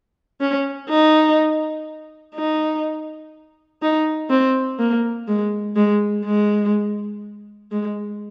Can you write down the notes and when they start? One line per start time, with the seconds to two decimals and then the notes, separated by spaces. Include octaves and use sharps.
0.41 C#4
0.89 D#4
2.35 D#4
3.82 D#4
4.30 C4
4.79 A#3
5.28 G#3
5.76 G#3
6.25 G#3
7.72 G#3